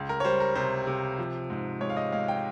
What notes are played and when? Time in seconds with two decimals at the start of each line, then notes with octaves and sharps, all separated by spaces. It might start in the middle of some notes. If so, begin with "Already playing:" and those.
Already playing: C#2
0.09 A#4
0.20 C#5
0.25 G3 C5
0.40 A#4
0.56 C3 C5
0.87 C3
1.19 F3
1.50 G#2
1.81 G#3 C#5
1.90 F5
1.97 D#5
2.12 G#3 F5
2.28 G5